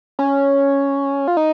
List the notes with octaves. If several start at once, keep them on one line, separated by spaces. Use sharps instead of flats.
C#4
F4
D#4